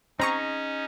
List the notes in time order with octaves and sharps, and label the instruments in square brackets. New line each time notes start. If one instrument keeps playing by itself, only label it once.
[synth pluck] C4 A#5 C#6 [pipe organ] C#4 [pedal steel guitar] D#4 G#4